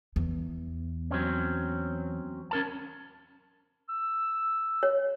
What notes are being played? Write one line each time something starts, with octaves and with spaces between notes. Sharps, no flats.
E2
F#3 C4 C#4
C#4 A#4 A5
E6
C#5